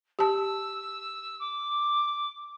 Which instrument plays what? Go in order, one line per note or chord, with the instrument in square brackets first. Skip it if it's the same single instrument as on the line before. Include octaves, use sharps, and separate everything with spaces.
[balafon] G4 A5 [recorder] E6
[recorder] D6